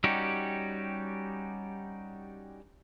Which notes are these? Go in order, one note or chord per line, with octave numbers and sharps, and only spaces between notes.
G3 C#4 D#4 F#4 G4